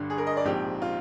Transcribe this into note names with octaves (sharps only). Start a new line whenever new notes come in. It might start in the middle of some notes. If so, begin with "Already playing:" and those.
Already playing: G1 G2 D3
G#4
A#4
D#5
D5
A#1 G#2 F3 C4 G4
F4